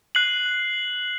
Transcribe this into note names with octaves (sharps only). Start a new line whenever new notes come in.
F#6 C7 F#7